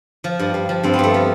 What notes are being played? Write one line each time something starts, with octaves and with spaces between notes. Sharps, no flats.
F3
G2
G2
F3
G2 C4
B3
G2 A3
F3